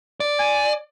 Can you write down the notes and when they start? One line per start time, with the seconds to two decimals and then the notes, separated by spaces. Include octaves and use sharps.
0.20 D5
0.39 G#5